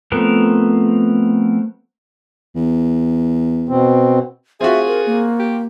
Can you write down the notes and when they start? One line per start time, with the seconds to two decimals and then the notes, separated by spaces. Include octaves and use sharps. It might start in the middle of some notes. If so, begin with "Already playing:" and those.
0.12 F3 A3 B3 C4 A#4
2.56 E2
3.69 B2 C4
4.61 C4 F4 F#4 G#4 E5
4.87 A#4
5.06 A#3
5.40 G4